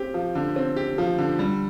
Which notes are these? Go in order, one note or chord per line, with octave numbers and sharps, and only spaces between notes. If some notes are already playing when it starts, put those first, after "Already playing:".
Already playing: C4 G4
F3
D3
C4
G4
F3
D3
G3